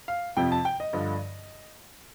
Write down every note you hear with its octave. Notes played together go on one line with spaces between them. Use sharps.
F5
F2 C3 F3 G5
A5
G5
D#5
G2 D3 F3